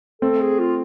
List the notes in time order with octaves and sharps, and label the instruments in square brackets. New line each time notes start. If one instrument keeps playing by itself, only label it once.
[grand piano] A3 C4 [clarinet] A4
[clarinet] G#4
F4